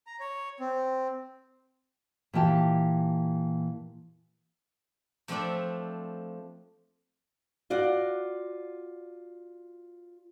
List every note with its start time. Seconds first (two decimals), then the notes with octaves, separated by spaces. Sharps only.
0.07 A#5
0.20 C#5
0.60 C4
2.33 A#2 E3 G4 A5
5.28 F3 A3 C4 D4 D5 E5
7.70 F4 F#4 D5 F#5